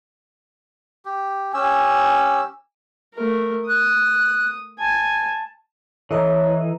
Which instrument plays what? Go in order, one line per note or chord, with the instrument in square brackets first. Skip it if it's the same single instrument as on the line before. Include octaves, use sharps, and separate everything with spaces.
[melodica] G4
[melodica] C#4 G4 E6 [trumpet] G#5
[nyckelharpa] A3 A#4
[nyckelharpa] D#6 [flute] F#6
[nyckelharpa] G#5 [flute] A5
[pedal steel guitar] E3 [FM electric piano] A4 D#5 A#5 [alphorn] C#5